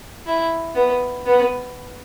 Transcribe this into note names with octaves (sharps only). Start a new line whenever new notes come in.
E4
B3
B3